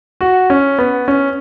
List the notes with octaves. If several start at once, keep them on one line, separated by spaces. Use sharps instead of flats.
F#4
C#4
B3
C#4